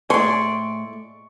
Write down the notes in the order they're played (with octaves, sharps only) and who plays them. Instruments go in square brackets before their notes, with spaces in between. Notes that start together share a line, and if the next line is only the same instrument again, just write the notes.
[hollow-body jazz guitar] A2 G#4 [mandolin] D5 C6 [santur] C#6